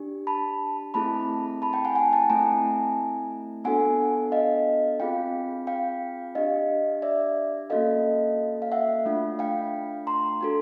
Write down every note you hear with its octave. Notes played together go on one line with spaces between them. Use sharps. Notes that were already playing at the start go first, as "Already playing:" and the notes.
Already playing: D4 G4
A5 B5
A3 C4 E4 G#4 A5 B5
A5 B5
G5 A5
F#5 G#5
F#5 G#5
G5 A5
A3 C4 E4 G#5 A#5
B3 D4 F#4 A4 F#5 G#5
D#5 F5
C4 F4 G#4 F5 G5
F5 G5
D4 G4 D#5 F5
D5 E5
A#3 C#4 F#4 A4 D#5 F5
F5
E5 F#5
A3 D4 F4
F5 G5
A#5 C6
D4 F#4 A4